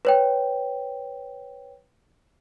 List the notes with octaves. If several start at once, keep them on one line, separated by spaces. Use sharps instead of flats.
B4 C#5 G5